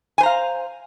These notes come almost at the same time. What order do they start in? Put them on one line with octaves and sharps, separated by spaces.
G#5 C5 A#5 F5